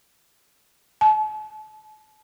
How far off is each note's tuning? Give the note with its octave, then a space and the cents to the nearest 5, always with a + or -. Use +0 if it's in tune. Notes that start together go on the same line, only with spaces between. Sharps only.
A5 -40